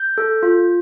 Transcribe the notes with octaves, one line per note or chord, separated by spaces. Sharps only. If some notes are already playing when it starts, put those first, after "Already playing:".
Already playing: G6
A4
F4